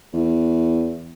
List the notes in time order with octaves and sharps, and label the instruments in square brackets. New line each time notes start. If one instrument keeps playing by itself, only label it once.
[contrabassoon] E2